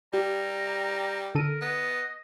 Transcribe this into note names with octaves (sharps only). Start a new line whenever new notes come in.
G3 G4 A#5
D3 A4 A#4 D#7
B3 D#5